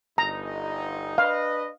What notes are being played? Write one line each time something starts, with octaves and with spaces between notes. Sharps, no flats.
G1 D#4 A#5
D4 B4 D#5 F5